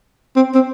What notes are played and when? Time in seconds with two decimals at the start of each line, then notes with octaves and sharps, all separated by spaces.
0.36 C4
0.55 C4